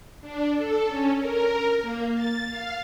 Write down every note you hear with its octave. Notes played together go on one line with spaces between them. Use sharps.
D4
A4
C#4
A#4
A#3
A6
F5